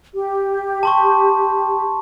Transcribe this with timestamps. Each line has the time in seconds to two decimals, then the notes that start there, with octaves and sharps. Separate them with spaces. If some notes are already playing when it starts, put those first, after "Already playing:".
0.14 G4
0.83 A5 C6 C#6